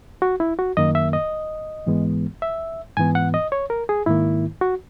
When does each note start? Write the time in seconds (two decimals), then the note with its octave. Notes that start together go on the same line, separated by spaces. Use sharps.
0.22 F#4
0.40 E4
0.59 F#4
0.77 F#2 D#3 A#3 D#5
0.95 E5
1.13 D#5
1.86 G#2 E3 G#3 B3
2.42 E5
2.97 G#2 E3 B3 G#5
3.15 F#5
3.34 D#5
3.52 C#5
3.70 A#4
3.89 G#4
4.06 G#2 D#3 A#3 E4
4.61 F#4